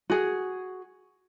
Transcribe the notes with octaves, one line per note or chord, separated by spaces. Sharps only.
F#4 G#4